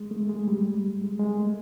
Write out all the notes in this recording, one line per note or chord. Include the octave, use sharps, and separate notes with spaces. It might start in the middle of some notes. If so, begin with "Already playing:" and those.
Already playing: G#3
A3
G#3
G3
G#3
G#3
A3